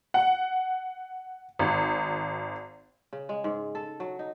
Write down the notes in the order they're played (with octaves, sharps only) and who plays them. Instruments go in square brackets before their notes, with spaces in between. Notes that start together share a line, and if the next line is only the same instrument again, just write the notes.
[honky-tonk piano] F#5
G#1
[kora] C#3
G#3
G#2
A4
F#3
D#4